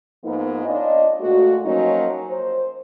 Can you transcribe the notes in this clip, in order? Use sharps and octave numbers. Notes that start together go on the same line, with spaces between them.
G#2 F3 A#3 B3 D#4
D4 F4 C#5 D#5
A#2 G#3 A3 F#4
F3 F#3 A#3 C#4 D#4 F#4
C5